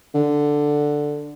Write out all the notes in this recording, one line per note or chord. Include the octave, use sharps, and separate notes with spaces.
D3